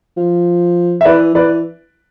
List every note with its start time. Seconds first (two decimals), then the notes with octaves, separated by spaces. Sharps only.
0.17 F3
1.01 E5
1.05 E3 B4 D5
1.35 E3 B4 D5